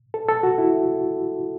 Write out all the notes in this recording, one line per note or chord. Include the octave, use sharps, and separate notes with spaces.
A4
A4
F#4
E4